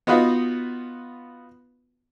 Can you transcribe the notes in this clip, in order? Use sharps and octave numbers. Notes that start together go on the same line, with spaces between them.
B3 D#4 F4 F#4 B4 F5